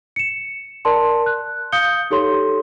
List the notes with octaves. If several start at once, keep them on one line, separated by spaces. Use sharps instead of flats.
C#7 E7
A#4 D5 A5 C6
F#6
F5 D#6 G6 C#7 G7
D#4 G4 A4 C#5 C6